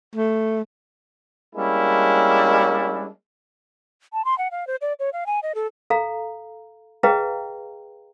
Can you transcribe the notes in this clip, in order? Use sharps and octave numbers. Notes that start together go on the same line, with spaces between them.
A3
G3 G#3 A#3 C#4 D4 E4
A5
C6
F#5
F5
C5
D5
C#5
F5
G#5
D#5
A4
A4 F5 A#5
G#4 B4 D#5 F5 G5 A#5